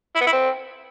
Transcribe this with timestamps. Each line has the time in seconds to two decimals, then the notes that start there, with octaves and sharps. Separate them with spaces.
0.15 E4
0.21 B3
0.27 E4
0.32 C4